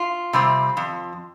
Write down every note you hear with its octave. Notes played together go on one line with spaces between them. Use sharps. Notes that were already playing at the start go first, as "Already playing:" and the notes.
Already playing: F4
C3 G3 C4
F2